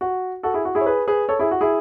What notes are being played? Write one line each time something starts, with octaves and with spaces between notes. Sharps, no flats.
F#4
F#4 A4
E4 G#4
F#4
E4 G#4
C#5
G#4 B4
G#4 B4
A4 C#5
E4 G#4
F#4
E4 G#4